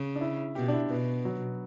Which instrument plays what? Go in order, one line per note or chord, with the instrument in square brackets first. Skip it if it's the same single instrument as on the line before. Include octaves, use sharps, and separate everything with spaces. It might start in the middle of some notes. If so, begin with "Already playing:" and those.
Already playing: [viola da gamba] C#3
[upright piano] D4
E4
[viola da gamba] B2 [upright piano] G4
[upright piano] D4
E4
[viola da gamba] B2 [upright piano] B3
[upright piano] F#3